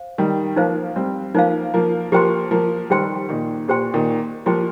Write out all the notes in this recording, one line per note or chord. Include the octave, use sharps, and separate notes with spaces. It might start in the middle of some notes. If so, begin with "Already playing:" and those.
Already playing: C5 F5
D#3 G3
F3 A#3 D#4 C5 F5
G3 C4
F3 A#3 D#4 C5 F5
F3 A#3
F3 A#3 G4 C5 G5 C6
F3 A#3
D#3 G3 G4 C5 G5 C6
A#2 D#3
A#2 G4 C5 G5 C6
A#2 D#3
F3 A#3 G4 C5 G5 C6